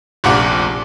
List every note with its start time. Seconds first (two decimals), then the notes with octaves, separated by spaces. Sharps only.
0.24 F1 A#1 A#2 F#5